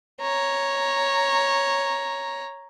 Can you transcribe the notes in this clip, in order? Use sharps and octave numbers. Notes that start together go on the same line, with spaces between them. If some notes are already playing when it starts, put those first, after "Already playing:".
C#5 A#5